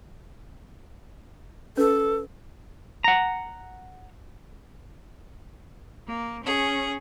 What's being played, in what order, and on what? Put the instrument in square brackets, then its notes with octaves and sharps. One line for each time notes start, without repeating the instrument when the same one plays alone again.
[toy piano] C#4 B4 [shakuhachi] A4
[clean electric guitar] F#5 A#5
[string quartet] A#3
C#4 G#4